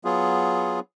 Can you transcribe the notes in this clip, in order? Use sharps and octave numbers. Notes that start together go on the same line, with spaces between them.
F#3 B3 F4 G#4